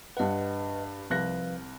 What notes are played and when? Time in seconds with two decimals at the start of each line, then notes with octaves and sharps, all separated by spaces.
0.17 G2 B4 D#5 F#5
1.10 C2 F3 B4 F5 F#6 A#6